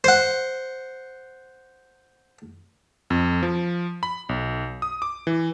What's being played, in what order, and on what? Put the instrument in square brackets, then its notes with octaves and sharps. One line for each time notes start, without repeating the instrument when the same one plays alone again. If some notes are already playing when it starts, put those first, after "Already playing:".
[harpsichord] C5 F#5
[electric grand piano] F2
F3
B5
B1
D#6
D6
E3